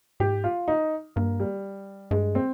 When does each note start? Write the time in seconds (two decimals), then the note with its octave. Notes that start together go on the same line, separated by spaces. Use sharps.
0.20 G#2 G4
0.44 F4
0.68 D#4
1.16 G2 A#3
1.40 G3
2.11 G2 G#3
2.35 C4